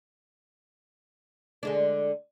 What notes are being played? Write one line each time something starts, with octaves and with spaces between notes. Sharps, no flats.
D3 G#3 D4